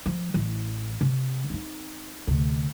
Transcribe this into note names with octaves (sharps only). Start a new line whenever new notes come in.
F3
A1 E3
C3
C4 D#4
D2 C3